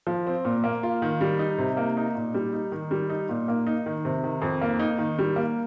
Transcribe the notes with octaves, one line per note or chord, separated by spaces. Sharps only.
F3
C4
A#2
A#3
F4
D#3
G3
D#4
C3
A#3
D#4
A#2
G3
D#4
D#3
G3
D#4
A#2
A#3
D#4
D#3
C3
D#3
F2
A#3
D#4
D#3
G3
A#3